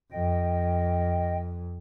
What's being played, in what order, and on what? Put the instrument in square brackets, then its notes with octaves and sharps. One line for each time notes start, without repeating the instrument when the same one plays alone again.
[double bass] F2 [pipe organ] D#5 G5